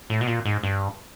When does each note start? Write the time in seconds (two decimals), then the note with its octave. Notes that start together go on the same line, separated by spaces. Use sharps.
0.10 A2
0.21 B2
0.27 A#2
0.45 G#2
0.63 G2